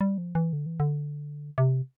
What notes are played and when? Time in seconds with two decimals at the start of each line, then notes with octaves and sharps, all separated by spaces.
0.01 G3
0.18 F3
0.35 E3
0.53 D3
0.66 E3
0.80 D3
1.58 C3